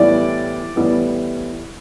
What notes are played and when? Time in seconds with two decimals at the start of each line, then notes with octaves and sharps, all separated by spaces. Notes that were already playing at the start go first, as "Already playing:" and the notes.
Already playing: A2 E3 G3 B3 D5
0.76 A2 E3 G3 B3